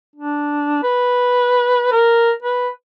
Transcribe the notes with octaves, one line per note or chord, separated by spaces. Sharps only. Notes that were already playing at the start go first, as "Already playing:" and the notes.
D4
B4
A#4
B4